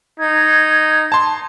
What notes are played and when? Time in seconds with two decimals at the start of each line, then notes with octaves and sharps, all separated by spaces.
0.19 D#4 G#6
1.12 A5 C6